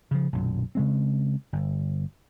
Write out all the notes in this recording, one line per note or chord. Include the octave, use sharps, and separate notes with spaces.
C#3 F3
B1 F#2 A#2
C#3 G#3 C4
G1